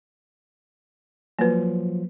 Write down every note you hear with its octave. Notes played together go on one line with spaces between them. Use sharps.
F3 F#3 A#3 B4